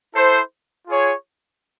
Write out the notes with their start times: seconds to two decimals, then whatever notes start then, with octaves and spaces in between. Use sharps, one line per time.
0.15 E4 A4 C5
0.87 F4 G#4 C#5